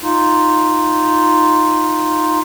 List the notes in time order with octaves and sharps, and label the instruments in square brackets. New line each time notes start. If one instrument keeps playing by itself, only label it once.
[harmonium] D#4 F4